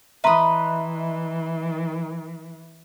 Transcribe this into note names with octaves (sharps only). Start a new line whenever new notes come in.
E3 B4 D#5 E5 A#5 C6